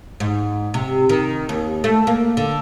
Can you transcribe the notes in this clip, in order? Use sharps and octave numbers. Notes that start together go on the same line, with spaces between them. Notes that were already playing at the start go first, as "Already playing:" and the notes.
G#2
C3
D#3
D#2
A3
A#3
D3